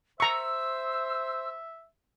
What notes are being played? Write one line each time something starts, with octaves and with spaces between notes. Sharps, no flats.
C5 E5 A#5 C#6 E6